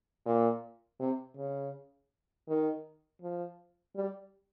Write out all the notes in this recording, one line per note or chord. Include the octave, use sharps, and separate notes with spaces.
A#2
C3
C#3
D#3
F3
G3